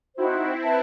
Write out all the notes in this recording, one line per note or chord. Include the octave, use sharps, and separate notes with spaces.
C4 D#4 E4 F#4 C5
B4 E5 A5